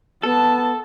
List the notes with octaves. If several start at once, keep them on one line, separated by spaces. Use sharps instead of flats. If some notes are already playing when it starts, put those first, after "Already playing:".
B3 A4 A5